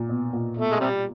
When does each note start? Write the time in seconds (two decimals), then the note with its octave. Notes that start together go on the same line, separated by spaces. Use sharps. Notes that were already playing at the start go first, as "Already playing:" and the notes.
Already playing: A#2
0.09 B2
0.33 A#2
0.57 B2 A3
0.71 G#3
0.80 C3 G3